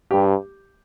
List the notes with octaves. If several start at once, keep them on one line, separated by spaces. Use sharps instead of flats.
G2 G4